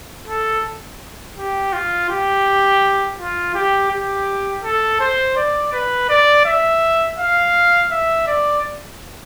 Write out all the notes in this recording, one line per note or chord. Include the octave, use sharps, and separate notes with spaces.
A4
G4
F4
G4
F4
G4
G4
A4
C5
D5
B4
D5
E5
F5
E5
D5